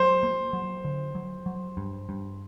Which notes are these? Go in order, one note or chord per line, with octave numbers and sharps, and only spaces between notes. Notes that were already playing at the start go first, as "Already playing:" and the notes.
Already playing: F#3 C5
A#3
F#3
D3
F#3
F#3
G2
G2